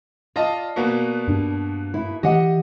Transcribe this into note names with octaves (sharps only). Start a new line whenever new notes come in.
F4 D5 D#5 A5
B2 A#3 B3
G2 D4
E4
E3 G4 D#5 F#5